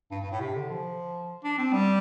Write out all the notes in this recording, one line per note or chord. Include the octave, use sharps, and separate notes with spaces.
G2
G2
A2
C3
D3
F3
D4
C4
G3